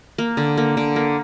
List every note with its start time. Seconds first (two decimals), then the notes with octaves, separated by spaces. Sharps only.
0.18 A#3
0.37 D3
0.57 A#3
0.77 D3
0.96 A#3